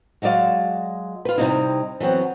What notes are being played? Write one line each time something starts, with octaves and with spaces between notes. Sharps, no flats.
F#3 G#3 F#4 D5 F5
F4 B4
C3 G3 A#3 C4 D#4 E4
E3 F#3 B3 C4